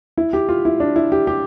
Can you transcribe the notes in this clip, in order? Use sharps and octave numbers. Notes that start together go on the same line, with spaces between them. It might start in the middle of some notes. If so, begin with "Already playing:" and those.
E4
G4
F4
E4
D4
E4
G4
G4